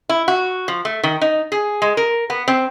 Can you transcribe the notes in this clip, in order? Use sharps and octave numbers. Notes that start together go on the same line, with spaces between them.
E4
F#4
F3
A3
D#3
D#4
G#4
G#3
A#4
B3
C4